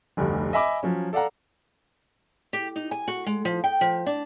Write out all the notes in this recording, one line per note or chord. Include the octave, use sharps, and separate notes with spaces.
F1 D2 G2
D#5 E5 G#5 B5 D6
F3 F#3 C#4
A4 D5 F5 F#5 A#5
G4
D#4
G#5
F#4
G#3
F3
G5
F3
D4